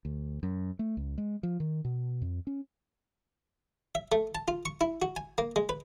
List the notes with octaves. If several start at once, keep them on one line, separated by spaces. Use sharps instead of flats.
D2
F#2
A3
C#2
G#3
F3
D#3
B2
F2
C#4
E5
A3
A5
F4
C#6
E4
F#4
G#5
A#3
G#3
B4